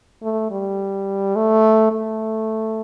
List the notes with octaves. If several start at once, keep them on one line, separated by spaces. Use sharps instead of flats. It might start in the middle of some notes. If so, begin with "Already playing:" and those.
A3
G3
A3
A3